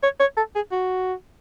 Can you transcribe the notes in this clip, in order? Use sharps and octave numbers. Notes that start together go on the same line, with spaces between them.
C#5
C#5
A4
G#4
F#4